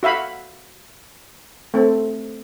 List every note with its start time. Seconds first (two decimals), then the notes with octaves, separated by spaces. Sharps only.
0.03 F#4 E5 F5 B5
1.74 A3 C4